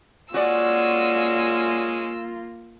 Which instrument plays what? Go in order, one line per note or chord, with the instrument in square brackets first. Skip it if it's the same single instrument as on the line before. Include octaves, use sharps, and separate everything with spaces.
[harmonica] G#3 C#4 [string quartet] A#3 F4 [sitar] F#4 D5 [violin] E6